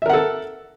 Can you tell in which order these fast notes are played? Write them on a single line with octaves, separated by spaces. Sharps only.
E5 A#4 F#5 A4